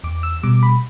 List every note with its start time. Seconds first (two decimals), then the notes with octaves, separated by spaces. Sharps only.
0.04 E2 D6
0.23 E6
0.43 B2 G3 D6
0.63 B5